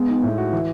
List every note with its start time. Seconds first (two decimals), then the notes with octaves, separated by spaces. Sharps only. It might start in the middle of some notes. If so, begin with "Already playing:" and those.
Already playing: G#3 B3
0.08 D#4
0.23 A2
0.38 F#4
0.53 E3